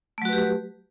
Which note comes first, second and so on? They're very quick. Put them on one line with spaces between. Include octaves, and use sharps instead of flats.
A3 F#3 F#4 B4 G4